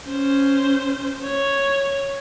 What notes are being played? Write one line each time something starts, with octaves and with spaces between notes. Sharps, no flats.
C#4 C5
C#5